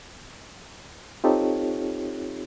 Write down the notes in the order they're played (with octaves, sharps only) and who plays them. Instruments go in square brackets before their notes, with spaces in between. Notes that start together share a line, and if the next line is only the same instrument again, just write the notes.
[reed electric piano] C4 D#4 F4 G4 A4 C#5